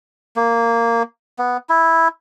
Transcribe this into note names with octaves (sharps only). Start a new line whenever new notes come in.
A#3
B3
E4